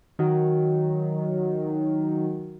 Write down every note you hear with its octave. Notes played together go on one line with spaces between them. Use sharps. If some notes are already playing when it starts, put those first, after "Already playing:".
D#3 F#3